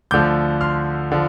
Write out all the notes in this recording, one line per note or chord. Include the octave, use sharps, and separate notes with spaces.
D2 D3 F3 D6 G6
C6 F6
D3 F3